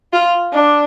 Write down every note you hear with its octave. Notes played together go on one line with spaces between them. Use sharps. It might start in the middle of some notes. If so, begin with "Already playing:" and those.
F4
D4